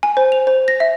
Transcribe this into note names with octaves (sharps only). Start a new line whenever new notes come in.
G#5
C5
F7
C5
A#6
E5